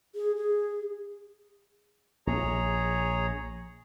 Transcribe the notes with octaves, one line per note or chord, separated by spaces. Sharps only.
G#4
G#4
A#1 G#4 C#5 A#5